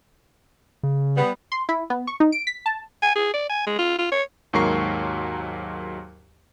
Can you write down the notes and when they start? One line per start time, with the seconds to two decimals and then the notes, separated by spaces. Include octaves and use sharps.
0.83 C#3
1.16 G3 B3
1.52 C6
1.69 E4
1.90 B3
2.07 C#6
2.20 D#4
2.32 D7
2.47 B6
2.66 A5
3.02 G#5
3.16 G#4
3.34 D5
3.49 G#5
3.67 G#3
3.79 F4
3.99 F4
4.12 C#5
4.53 D#2 G#2 F#3 A#4 C#6 C7